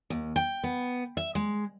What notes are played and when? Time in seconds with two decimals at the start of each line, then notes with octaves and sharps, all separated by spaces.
0.10 D#2
0.36 G5
0.64 B3
1.17 E5
1.35 G#3